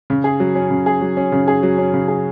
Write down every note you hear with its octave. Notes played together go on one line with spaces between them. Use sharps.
C#3
G#4
F#3
C#4
C#3
G#4
F#3
C#4
C#3
G#4
F#3
C#4
C#3
G#4